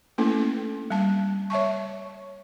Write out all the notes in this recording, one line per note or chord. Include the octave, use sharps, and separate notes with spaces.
A3 A#3 C#4 D4 E4 A4
G3 A5
C#5 E5 A5 C#6